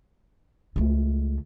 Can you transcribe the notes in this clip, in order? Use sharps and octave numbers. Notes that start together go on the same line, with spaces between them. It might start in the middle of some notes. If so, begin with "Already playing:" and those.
C#2 A3